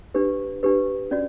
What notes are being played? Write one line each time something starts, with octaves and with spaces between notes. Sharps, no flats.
D4 G4 B4
D4 G4 B4
C#4 F#4 D5